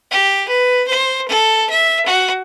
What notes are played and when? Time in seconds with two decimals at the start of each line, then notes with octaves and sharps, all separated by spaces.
0.11 G4
0.49 B4
0.88 C5
1.28 A4
1.70 E5
2.06 F#4